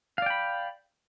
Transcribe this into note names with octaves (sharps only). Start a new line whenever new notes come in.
D5 F5 G5 B5